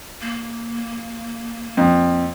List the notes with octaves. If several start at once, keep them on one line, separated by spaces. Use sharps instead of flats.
A#3
F2